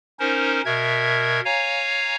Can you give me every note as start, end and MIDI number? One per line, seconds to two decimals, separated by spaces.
0.19 0.62 61
0.19 0.62 63
0.19 0.62 70
0.19 0.62 72
0.65 1.41 47
0.65 1.41 70
0.65 1.41 76
0.65 1.41 92
1.45 2.16 73
1.45 2.16 77
1.45 2.16 80
1.45 2.16 82